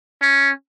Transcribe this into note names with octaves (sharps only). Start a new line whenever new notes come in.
C#4